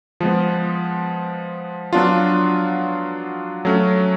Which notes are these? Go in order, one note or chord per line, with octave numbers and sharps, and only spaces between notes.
F3 G#3 B3
F#3 B3 D4 F4
F#3 A3 C#4